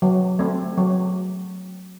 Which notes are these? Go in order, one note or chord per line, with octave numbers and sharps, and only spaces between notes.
F#3
A3 C4
F#3